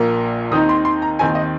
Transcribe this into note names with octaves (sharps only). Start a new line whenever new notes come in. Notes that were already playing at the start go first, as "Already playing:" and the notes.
Already playing: A#1 A#2 A#3
D#2 D#3 C4 D#4 D#6
C6
C6
A#5
D#2 D#3 C4 D#4 G#5
D#5